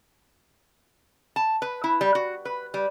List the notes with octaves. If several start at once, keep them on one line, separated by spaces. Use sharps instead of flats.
A5
B4
E4
G3
F#4
B4
G3